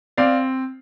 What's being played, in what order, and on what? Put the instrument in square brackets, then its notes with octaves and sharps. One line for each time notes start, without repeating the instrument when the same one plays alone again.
[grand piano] C4 D5 F5